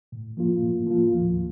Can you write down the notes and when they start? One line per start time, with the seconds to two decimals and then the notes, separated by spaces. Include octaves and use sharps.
0.12 A2
0.37 F3 A#3 F4
0.62 A2
0.87 F3 A#3 F4
1.13 D#2